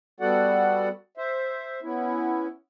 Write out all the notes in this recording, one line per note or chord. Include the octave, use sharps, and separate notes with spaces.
G3 B3 F#4 A4 D5 F#5
C5 E5
B3 C#4 E4